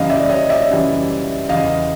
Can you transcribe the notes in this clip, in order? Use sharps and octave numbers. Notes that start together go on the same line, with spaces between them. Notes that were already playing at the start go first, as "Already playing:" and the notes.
Already playing: F#2 C#3 E3 G3 D#5 F5
D5 E5
C#5 D#5
D5 E5
F#2 C#3 E3 G3
E2 C#3 E3 D#5 F5